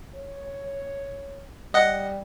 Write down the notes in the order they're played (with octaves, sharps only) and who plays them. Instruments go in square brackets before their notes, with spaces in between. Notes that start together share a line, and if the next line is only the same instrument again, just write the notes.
[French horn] C#5
[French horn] G3 [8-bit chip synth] D#5 F#5